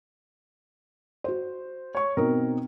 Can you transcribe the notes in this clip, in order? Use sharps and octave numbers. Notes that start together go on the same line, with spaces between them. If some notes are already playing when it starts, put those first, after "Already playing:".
F#4 C5
C#5 C#6
B2 C4 D#4 A#4